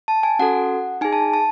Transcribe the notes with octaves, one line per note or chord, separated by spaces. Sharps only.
A5
G#5
C#4 F#4 A4 F#5
D#4 G#4 G#5
A5
A5